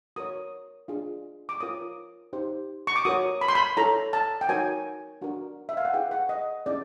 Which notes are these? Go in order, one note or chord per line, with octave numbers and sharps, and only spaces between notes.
F#4 A#4 C#5 D#6
D4 F4 G#4
D6
F4 A#4 C#5 D#6
D#4 G4 C5
C#6
D6
F#4 A#4 C#5 D#6
B5
C6
B5
E4 A4 C#5 A#5
A5
G5
D#4 F#4 A#4 C#5 G#5
D4 F#4 A#4
E5
F5
F#5
E4 G#4 B4 G5
F#5
D#5
C#4 E4 G#4 D5